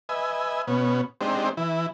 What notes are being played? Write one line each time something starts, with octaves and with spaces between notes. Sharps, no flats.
B4 D#5 E5 G#5
B2 B3 C#4
G#3 C4 D4 D#4 G4 C5
E3 E4